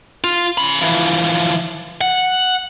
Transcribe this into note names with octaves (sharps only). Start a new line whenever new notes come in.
F4
C#4 B5
E3 F3
F#5